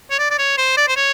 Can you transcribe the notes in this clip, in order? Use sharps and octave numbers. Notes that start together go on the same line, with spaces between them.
C#5
D5
D5
C#5
C5
D5
C5
C#5